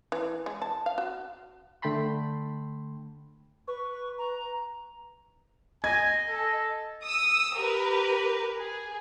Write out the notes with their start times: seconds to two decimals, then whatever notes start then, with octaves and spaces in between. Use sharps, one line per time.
0.12 E3
0.46 G#3
0.62 A5
0.86 F5
0.98 F#4
1.82 D3 A3 G5 A5 B5 C6
3.68 B4 C#6
4.18 A#5
5.84 D#5 G#5 G#6
6.28 A4
7.04 D#6 E6
7.58 G4 A#4 B4
8.58 G#4